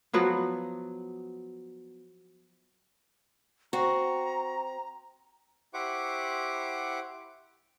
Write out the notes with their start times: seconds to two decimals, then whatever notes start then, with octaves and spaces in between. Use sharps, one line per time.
0.13 F3 F#3 B3 F#4
3.73 C4 F#4 A#5
5.74 E4 G4 C5 F#5 C#6 D6